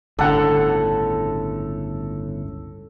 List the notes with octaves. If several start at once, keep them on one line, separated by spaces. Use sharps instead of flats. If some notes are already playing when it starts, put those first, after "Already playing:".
G1 C#2 A2 D3 A4 F#5